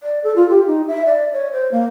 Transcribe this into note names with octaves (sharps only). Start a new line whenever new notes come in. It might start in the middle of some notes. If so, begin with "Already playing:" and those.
D5
A4
F4
G4
D#4
E5
D5
C#5
C5
A#3